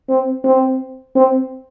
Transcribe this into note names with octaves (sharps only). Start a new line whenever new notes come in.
C4
C4
C4